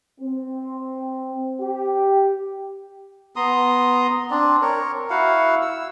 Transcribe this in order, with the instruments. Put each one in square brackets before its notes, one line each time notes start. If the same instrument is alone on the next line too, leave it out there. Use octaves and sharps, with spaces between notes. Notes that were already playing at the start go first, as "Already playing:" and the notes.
[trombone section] C4
G4
[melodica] B3 A#5 C6 D#6
C4 D4 D5
A#4 C#5
E4 F#4 F5 F#5
E6